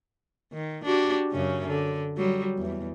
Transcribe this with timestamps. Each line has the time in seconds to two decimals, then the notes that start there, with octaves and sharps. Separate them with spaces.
0.53 D#3
0.84 D4 F#4 G4
1.31 F#2 C#3 C#4
1.67 D3
2.17 F#3 G3
2.58 E2